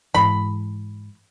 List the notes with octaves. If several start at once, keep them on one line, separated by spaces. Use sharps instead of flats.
G#2 E3 B5